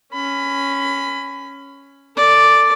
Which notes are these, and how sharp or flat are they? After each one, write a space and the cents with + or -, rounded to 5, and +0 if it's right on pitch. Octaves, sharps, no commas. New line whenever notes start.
C#4 +0 B5 +25
A4 +25 D5 +0